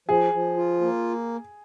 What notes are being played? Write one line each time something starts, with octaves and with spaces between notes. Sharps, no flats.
F3 G#4
F3
F4
A#3